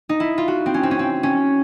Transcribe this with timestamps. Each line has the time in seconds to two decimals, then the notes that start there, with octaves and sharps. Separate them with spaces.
0.09 D#4
0.20 E4
0.38 F4
0.48 F#4
0.66 C4
0.74 C#4
0.83 C4
0.91 C#4
0.99 C4
1.23 C#4